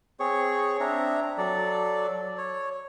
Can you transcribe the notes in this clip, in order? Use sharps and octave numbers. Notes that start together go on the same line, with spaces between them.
C4 G#4 C#5 C#6
C4 D4 E5 A#5
F#3 A4 D5
C#5